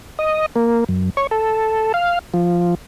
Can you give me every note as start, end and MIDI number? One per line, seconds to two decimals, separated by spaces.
0.19 0.46 75
0.56 0.84 58
0.89 1.10 42
1.17 1.27 73
1.31 1.92 69
1.94 2.19 77
2.34 2.75 53